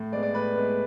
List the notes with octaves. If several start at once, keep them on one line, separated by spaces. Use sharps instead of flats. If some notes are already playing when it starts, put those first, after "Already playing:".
Already playing: A2
G#3 B3 D5
D5
A2 B4
G#3 B3